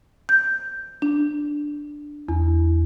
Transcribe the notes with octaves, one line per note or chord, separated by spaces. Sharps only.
G6
D4
E2